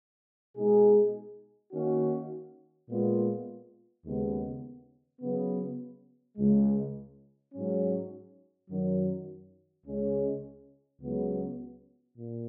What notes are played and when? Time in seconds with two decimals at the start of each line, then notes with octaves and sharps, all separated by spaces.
0.56 B2 G#3 D#4 G#4
1.72 D#3 A#3 C#4 F#4
2.88 A#2 G#3 B3 F4
4.05 D#2 C#3 G#3 B3
5.20 C#3 F#3 B3
6.37 C#2 C#3 G#3
7.52 G#2 F#3 C#4
8.69 F#2 D#3 F#3
9.85 C#2 C#3 G#3 C#4
11.01 C#2 C#3 F#3 B3
12.17 A#2